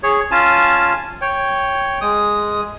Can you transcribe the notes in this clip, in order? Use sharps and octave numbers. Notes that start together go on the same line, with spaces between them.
G#4 C#5
C#4 F4 G#5 A5
C#5 G5
G#3 D#6